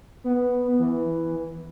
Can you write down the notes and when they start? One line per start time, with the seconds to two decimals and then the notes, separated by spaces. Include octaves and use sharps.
0.24 B3
0.79 E3